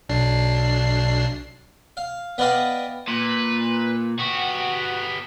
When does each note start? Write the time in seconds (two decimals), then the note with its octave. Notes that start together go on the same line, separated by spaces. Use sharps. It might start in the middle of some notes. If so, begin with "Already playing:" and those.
0.09 B1 D4 C7
1.97 F5
2.38 B3 B4 D5 D#5 F5 G5
3.08 A#2 B4
4.19 B3 F#4 G4